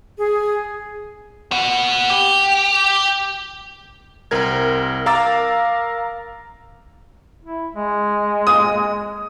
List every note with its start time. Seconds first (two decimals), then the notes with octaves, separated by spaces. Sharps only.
0.18 G#4
1.52 B2 F#5
2.10 G4
4.31 C2 C4 A#4 G#6
5.06 A#4 F5 A#5 D6 E6 A6
7.44 E4
7.75 G#3
8.47 D#6